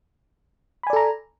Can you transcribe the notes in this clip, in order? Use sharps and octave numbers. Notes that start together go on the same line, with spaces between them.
A4 D5 G#5 A#5 B5